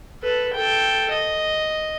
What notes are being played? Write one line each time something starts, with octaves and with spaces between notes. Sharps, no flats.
A4 B4
A4 G5
D#5